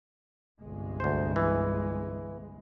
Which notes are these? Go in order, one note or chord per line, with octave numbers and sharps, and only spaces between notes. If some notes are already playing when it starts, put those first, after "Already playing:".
G1 C2 G#3
D2 C5
E3